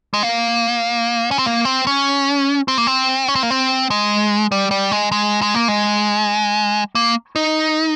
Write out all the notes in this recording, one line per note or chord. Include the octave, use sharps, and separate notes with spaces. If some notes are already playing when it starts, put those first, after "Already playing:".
G#3
A#3
C#4
C4
A#3
C4
C#4
C4
A#3
C4
C#4
C4
A#3
C4
G#3
G3
G3
G#3
G#3
G#3
A#3
G#3
A#3
D#4